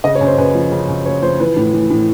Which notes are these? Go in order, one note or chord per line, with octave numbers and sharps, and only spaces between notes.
C#3 D#5
C#5
F#2
C5
F#2 B4
F3
C#3
F#2
F#2 C#5
F3 C5
E3 B4
A2
E3
A2